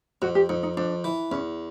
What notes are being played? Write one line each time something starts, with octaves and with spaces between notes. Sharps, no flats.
F2 F#4
G4
F2 D#4
D#4
F2 D4
E3
E2 C#4